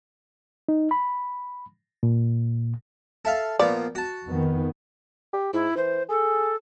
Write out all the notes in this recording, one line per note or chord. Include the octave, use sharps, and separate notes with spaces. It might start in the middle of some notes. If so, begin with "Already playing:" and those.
D#4
B5
A#2
A4 E5 F5
A#2 F3 B3 D5
F#4 A5
F2 D#3 B3
G4
G#2 E4
E3 C5
G#4 A4